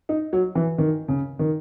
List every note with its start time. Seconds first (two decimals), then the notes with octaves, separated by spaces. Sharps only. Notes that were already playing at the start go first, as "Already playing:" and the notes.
0.09 D#4
0.33 F#3
0.55 E3
0.78 D#3
1.08 C#3
1.39 D#3